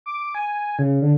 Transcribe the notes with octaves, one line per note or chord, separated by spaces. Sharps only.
D6
G#5
C#3
D3